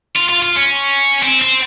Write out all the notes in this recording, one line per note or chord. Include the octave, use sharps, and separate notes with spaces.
F4
F4
F4
C#4
C4
C4